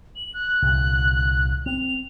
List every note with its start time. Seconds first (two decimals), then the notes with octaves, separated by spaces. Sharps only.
0.16 F#7
0.34 F#6
0.62 C2 A#2 D3
1.66 C4 F7